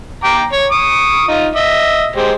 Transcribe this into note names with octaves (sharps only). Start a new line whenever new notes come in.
G5 A#5 D6
C#5
C#6 D#6
D#4 F4
D#5 E5
G#3 G4 C5